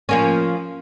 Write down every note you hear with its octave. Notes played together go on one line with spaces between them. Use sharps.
F3 A#3 C#4